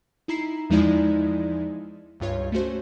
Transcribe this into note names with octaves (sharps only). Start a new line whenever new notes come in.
D#4 E4 A#5 C7
E2 F3 G#3 D#4 E4 D5
C#2 G2 F4 C#5
A3 C#4 F#4 C5